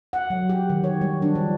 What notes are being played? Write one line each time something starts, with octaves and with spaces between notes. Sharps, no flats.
F#5
F#3
G4
D#3
C#5
G3
D4
F3